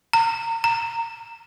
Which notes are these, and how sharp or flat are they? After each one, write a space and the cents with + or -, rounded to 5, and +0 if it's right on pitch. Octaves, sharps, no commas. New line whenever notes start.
A#5 -30
A#5 -15